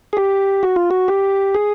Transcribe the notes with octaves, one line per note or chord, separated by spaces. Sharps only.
G#4
G4
F#4
F4
F#4
G4
G#4